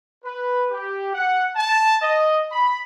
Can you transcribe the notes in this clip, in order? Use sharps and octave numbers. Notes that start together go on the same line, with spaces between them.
B4
G4
F#5
A5
D#5
B5